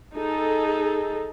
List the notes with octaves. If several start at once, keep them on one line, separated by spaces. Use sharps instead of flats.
D#4 G#4 A4